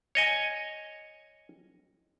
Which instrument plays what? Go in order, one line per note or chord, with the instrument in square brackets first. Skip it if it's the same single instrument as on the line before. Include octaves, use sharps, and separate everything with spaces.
[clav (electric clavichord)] C#5 D#5 G#5